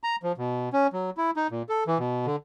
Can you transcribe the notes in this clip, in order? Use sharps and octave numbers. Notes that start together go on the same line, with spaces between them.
A#5
F3
B2
C#4
F#3
E4
D#4
A#2
A4
E3
B2
D3